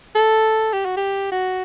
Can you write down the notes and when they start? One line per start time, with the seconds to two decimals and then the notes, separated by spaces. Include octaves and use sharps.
0.15 A4
0.73 G4
0.86 F#4
0.97 G4
1.32 F#4